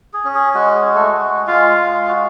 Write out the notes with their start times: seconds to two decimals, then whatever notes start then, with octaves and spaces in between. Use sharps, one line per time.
0.14 G#4
0.24 C#4
0.35 G#4
0.55 G#3 F#4
0.75 G#4
0.85 F#4
0.95 A3 A4
1.17 G#3
1.47 G#3 F4 F5
1.78 G#3
2.08 F#4